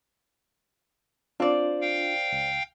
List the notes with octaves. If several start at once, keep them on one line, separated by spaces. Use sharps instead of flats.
C4 D4 F4 D5
F5 G5
C#2